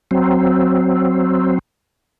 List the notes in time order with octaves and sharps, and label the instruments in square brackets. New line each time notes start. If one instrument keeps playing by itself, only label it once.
[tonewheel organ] F#3 C4